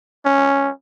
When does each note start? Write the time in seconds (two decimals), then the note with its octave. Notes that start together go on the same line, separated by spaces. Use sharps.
0.25 C#4